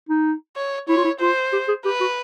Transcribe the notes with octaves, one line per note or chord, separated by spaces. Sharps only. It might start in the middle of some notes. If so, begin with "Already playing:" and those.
D#4
C#5
E4 C#5
F4
E4
F4 C5
G4
G#4
G4 B4
F#4